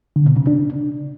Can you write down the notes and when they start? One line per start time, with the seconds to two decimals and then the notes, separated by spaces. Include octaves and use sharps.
0.16 D3
0.26 B2
0.37 C#3
0.47 D4